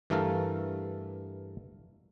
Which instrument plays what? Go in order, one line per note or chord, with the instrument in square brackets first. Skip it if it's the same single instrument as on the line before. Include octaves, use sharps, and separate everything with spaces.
[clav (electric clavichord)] G2 E3 A3 A4 A#4 F5